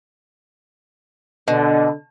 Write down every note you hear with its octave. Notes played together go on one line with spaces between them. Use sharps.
B2 D3